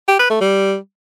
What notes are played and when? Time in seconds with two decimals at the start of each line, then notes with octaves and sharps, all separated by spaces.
0.08 G4
0.19 B4
0.30 A3
0.41 G3